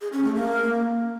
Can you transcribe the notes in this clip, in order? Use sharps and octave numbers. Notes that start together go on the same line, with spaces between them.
G#4
C#4
A3
A#3